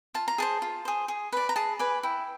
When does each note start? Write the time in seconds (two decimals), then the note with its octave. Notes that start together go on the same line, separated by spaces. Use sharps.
0.14 F4 A5
0.28 A#5
0.38 G#4 C5 A5
0.62 F4
0.85 G#4 C5
1.08 G#4
1.32 B4 D5
1.49 A#5
1.56 G#4 A5
1.79 B4 D5 G#5
2.03 E4 G5